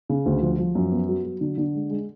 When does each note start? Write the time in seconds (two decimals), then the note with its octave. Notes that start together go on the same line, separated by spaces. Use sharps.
0.10 C#3
0.26 D2
0.42 F3
0.59 F3
0.75 F#2
0.92 B3
1.09 F#3
1.25 F#3
1.41 D3
1.58 D3
1.75 G#3
1.90 G#3